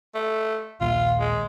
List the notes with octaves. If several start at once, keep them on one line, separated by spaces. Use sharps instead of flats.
A3
A#1 D#2 A#2 F4
G#3